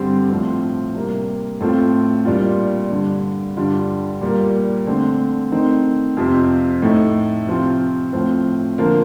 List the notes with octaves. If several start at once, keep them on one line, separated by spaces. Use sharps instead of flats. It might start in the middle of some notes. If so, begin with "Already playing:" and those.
Already playing: G2 D3 G3 C4
A2 F3 C4
C3 G3 A#3
A2 A3 C4 F4
A#2 G3 D4 F4
G2 D3 G3
G2 D3 G3 D4 F4
A#2 G3 A#3
D3 A3 C4
D#3 A3 C4 D#4
F2 C3 F3 C4
A2 A3 D#4
C3 F3 C4 F4
A2 F3 C4
D3 F3 A#3